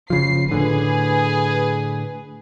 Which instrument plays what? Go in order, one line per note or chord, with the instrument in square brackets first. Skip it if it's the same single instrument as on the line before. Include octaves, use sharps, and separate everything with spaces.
[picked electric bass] F#1 C#3 F3 [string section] C7
[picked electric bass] A2 D3 [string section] G#4 B4